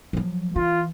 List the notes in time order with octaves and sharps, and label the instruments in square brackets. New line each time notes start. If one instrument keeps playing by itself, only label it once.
[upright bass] F3 F#3
[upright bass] E3 [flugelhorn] F4